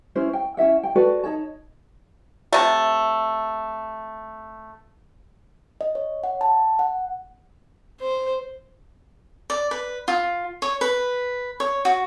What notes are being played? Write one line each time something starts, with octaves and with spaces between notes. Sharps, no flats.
C#4 E4 C5
G5
C#4 E4 E5 F#5
G5
F#4 A4 B4 D5
D#4 C#5 A5
C3 A3
D#5
C#5
F#5
A5
F#5
C5
D5
B4
F4
C#5
B4
C#5
F#4